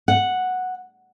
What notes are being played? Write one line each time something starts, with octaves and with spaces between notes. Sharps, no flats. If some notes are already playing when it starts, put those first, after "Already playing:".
F#5